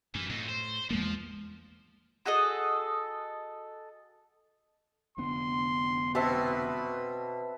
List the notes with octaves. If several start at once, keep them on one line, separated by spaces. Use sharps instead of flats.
F#2 E3
F2 A2
C5
E2 F3 G#3 A#3
F#4 G#4 A4 D#5
F1 D3 B3 C6
B2 C4 B4 E5 A5